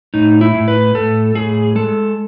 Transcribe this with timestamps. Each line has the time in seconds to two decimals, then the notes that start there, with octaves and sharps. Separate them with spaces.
0.14 A2 D#4
0.41 E4
0.54 A2
0.68 B4
0.95 A2 A4
1.35 A2 G#4
1.75 G#3 A4